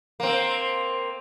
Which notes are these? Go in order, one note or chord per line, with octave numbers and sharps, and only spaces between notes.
A#3 C4